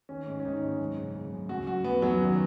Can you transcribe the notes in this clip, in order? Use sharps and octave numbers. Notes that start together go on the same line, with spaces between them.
D#3 C#4
G#2
C#4
D#3 D#4
G#2
F#2
C#3
C#3
F#2
F#2 F#4
F#2 F#4
F#2 B3
F#2 F#3
D#3